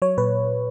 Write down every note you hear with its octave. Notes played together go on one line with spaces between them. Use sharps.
F#3 C#5
A#2 B4